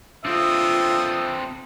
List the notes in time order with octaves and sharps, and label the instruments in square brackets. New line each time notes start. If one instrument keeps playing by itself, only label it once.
[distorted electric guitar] C4 D4 [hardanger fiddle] F4 [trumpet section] A4 E5 D#6